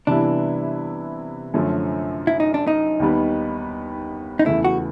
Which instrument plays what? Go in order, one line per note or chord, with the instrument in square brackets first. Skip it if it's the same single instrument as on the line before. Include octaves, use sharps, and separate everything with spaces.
[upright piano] C3 E3 G3 B3 E4 [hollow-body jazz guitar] D4
[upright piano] F#2 D3 F3 A3 C#4
[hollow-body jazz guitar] E4
D#4
D4
D#4
[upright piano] D#2 D#3 G3 B3
[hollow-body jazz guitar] D#4
[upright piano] E2 C#3 E3 A3 [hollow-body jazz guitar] E4
[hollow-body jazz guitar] F#4